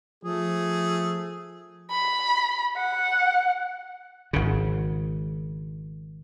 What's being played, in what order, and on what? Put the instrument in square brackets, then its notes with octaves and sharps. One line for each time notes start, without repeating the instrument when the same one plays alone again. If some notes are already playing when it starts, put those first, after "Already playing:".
[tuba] F3 [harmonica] A3 G#4
[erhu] B5
F#5
[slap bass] G#1 C#3